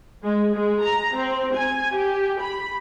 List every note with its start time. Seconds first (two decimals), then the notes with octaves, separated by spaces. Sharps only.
0.24 G#3
0.55 G#3
0.83 A#5
1.16 C4
1.54 G#5
1.95 G4
2.41 B5